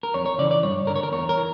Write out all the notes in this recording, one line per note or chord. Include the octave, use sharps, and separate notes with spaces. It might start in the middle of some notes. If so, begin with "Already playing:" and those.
A#4
F2 C#5
C#5
C#3 E3 D5
D5
G2 C#5
D3 A#4
C#5
A#4
E2 C#5
A#4
E3